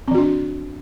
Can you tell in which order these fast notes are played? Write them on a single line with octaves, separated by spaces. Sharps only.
C4 E3 F#4 D4